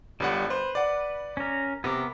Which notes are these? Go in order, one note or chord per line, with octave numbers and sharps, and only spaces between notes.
G1 G2 G3 F#5
B4 C5
D5 F#5
C#4 A#4
C3 B3 A#4 D6